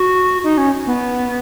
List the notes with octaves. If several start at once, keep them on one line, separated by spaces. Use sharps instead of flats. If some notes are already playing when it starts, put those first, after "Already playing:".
Already playing: F#4
D#4
C#4
B3